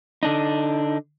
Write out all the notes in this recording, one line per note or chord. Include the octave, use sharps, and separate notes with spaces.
D3 D4 D#4